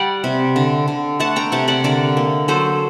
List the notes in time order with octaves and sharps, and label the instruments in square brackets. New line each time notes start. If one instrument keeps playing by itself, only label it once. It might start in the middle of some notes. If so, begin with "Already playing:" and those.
Already playing: [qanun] G3 D5 F#5
C3
D3
D3
A3 F#5 A5
G5 A#5
C3 F#5 A5
D5 F#5
D3 A#4 D5
A#3
F#3 A4 C5